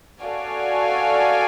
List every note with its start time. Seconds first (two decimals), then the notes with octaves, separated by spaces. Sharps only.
0.22 F#4 A4 D5 F5 G#5